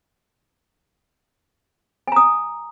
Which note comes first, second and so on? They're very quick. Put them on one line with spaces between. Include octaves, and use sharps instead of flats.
G#5 A#5 D#6